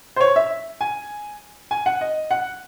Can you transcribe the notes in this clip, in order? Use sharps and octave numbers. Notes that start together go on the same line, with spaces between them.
C5
C#5
E5
G#5
G#5
F#5
D#5
F#5